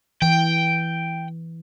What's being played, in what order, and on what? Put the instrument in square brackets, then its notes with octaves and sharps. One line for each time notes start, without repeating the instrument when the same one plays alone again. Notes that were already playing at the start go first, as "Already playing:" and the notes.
[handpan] E3 [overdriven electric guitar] G5